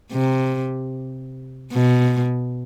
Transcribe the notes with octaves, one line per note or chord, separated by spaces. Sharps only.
C3
B2